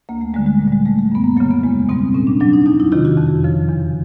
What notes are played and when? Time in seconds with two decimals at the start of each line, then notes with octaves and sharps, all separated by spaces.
0.09 D2 A#3
0.21 A3
0.34 D3 G3 G#3
0.46 G#3
0.59 A#2 G#3
0.67 G3
0.72 G#3
0.86 G3 A3
0.99 A3
1.12 F#2 B3
1.24 A#3
1.37 F#3 A#3
1.40 C#3
1.51 B3
1.63 E2 G#3
1.89 B2 G3 C4
2.14 A2 C#4
2.27 D4
2.40 F#3 D4
2.53 D#4
2.66 E2 D#4
2.80 E4
2.92 C3 D#3 F4
3.05 F#4
3.17 F2
3.44 C#3 F3
3.69 E2